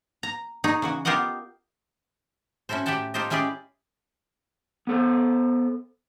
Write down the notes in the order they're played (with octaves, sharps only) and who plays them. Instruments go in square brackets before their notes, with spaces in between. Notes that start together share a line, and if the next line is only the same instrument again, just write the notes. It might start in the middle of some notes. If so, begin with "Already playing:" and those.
[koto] A#5
D#4 G#4 C#5
C#3 E3 F#4
B3 F4 G4 A#4 D#5 F#5
C#4 E4 F#4 A4 C5
A2 G4 E5 F#5 G5 A5
D#4 F4 G4 A4 C5 D#5
G#3 C#4 E4 G4 G#4 D5
[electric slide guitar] B3 A4 C5